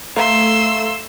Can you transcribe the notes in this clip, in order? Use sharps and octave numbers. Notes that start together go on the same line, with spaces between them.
A3 F5 A#5 C6 E6